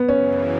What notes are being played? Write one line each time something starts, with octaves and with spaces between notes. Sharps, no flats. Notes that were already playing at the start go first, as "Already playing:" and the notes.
Already playing: B3
F#2 C#3 E3 C#4